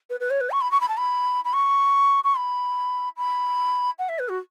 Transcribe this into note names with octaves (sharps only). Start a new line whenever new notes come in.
B4
B4
C#5
B4
C#6
B5
C#6
B5
A5
B5
B5
C#6
C#6
B5
B5
F#5
E5
B4
F#4